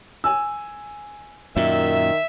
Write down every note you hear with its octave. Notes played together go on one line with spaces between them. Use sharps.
G#5 E6
F#2 A#2 D#3 E5